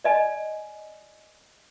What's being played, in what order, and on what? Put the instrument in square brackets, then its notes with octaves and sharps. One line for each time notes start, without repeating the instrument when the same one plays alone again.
[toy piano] D5 D#5 G#5